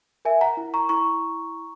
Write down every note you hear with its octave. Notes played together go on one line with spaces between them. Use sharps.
A#4 E5 G#5
F#5 A#5
E4
A#5 C#6
E4 A#5 C#6